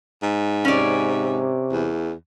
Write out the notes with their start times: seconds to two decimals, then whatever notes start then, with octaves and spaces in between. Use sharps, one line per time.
0.23 G#2
0.65 C3 C#4 D5
1.72 E2